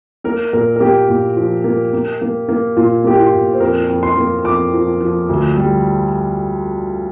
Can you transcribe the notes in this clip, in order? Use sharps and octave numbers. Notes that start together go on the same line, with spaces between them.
A#3 A#4
A#2 A#4
A#4
A#3 G4
A#2
F3
A#3
A#3
A#3
A#3
A#2 F4
A#3 G4
F4
A#2
C5
F2 A#4
F2
C6
A#3
F2 D6
F3
F3
D2
G3